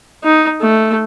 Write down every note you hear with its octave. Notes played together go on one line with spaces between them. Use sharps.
D#4
A3